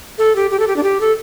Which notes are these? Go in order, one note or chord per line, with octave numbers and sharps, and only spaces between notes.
A4
G4
G4
A4
G4
D4
G4
A4